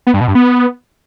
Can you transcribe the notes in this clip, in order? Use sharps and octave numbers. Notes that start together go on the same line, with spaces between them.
B3
G2
B2
G2
B3